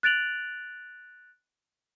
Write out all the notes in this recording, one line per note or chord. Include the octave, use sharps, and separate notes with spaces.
F#6 A6 D7 F7 F#7